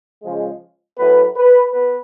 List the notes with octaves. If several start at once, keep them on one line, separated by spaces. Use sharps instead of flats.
C#3 F3 G#3
A2 F#3 B3 B4
B4
B3 B4